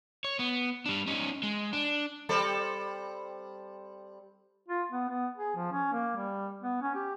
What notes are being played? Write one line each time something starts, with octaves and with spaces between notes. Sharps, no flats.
C#5
B3
G3 D4
C#4 D#4
G#3
D4
G3 C4 A4
F4
B3
B3
G#4
F3
C#4
A#3
G3
B3
C#4
G4